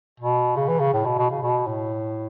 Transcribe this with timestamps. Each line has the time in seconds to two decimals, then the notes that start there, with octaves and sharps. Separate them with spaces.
0.20 B2
0.56 C#3
0.68 E3
0.80 C#3
0.93 A2
1.06 B2
1.18 B2
1.30 C#3
1.43 B2
1.67 A2